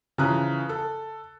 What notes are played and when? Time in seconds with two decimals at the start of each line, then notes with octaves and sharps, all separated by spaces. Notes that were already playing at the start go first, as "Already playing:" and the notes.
0.18 C#3 E3 F3 A#5 D#6 F#6
0.69 A4